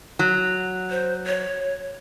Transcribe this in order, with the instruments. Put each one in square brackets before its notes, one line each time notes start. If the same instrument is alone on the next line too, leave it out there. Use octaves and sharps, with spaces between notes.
[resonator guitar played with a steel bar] F#3
[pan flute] C5
C#5